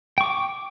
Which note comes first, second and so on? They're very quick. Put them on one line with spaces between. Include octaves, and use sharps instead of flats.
G5 C#6 D6